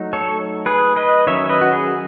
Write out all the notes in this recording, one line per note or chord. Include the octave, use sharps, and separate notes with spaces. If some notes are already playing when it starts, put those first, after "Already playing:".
Already playing: F#3 A3 D#4
A4 C#5
G#4 B4
B4 D#5
D#3 F#3 C#4 C#5 E5
B4 D#5
F#4
G#4